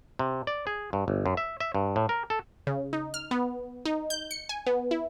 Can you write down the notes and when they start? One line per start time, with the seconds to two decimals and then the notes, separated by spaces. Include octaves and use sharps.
0.19 C3
0.47 D5
0.67 G#4
0.93 G2
1.08 G1
1.26 F#2
1.37 E5
1.60 E5
1.75 G2
1.96 A2
2.09 A#4
2.30 A4
2.67 C#3
2.93 D#4
3.14 F6
3.31 B3
3.85 D#4
4.10 G6
4.31 C#7
4.49 G#5
4.66 B3
4.91 E4